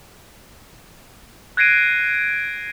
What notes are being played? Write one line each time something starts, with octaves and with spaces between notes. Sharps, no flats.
F#6 G#6 A#6 C7 D7 D#7